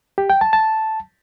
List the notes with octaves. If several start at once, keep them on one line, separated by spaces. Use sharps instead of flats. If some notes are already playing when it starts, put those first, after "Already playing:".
G4
G5
A5
A5